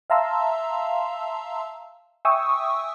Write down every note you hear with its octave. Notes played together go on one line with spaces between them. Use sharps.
E5 F5 A5 A#5 C6 E6
E5 G5 G#5 C#6 D#6 E6